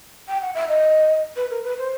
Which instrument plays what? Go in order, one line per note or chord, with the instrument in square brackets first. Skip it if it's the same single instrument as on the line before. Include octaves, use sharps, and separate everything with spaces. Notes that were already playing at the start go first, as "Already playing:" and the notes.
[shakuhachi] G5
F#5
E5
D#5
B4
A#4
B4
C5